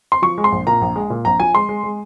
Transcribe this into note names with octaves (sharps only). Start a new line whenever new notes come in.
C6
F3 C#6
G#3
C6
A#1
A#2 A#5
A#1
G#3
A#2
A#1 A#5
F3 G#5
G#3 C6
G#3
G#3